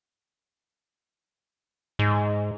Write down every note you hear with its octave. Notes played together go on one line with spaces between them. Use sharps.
G#2